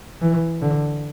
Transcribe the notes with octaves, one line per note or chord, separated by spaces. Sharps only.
E3
D3